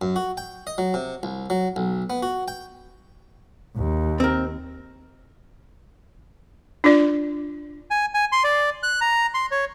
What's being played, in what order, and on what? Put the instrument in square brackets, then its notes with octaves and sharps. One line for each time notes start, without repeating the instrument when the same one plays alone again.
[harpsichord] F#2
F#4
G5
D#5
F#3
C3
C2
F#3
B1
B3
F#4
G5
[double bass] D#2
[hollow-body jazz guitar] C4 A#4
[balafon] D4 F4 D5
[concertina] G#5
G#5
C6
D5
F#6
A#5
C6
C#5